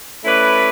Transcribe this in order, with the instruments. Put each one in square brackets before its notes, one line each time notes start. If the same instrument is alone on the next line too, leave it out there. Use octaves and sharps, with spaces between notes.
[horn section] A3 C#4 E4 B4 D5